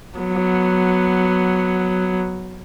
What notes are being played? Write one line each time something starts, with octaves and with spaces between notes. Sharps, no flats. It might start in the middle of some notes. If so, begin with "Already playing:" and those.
F#3 B3